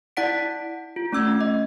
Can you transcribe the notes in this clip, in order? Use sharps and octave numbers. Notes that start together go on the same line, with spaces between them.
E4 D5 F#5 B6 D7
F4
A3 C#4 E6 G#6
D#5